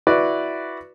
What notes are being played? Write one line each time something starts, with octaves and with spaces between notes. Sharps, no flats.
E4 F#4 B4 D5